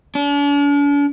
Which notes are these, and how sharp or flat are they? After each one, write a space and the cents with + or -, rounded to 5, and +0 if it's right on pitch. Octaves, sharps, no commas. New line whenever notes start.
D4 -45